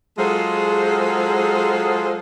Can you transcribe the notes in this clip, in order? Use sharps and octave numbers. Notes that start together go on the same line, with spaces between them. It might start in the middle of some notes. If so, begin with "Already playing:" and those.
F#3 G#3 F4 G#4 A4 C5